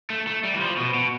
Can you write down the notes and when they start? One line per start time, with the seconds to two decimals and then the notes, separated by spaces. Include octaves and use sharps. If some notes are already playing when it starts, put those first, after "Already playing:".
0.10 A3
0.27 A3
0.44 G3
0.54 E3
0.61 F3
0.77 B2
0.94 B2